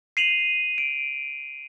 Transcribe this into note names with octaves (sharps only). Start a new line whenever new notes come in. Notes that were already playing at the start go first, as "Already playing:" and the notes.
C7 D#7 F7 F#7
D7